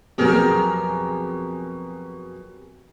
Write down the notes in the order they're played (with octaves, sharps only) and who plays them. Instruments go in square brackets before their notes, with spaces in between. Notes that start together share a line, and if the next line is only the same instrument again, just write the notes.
[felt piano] F2 B2 F#3 [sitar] G4 G#4 A#4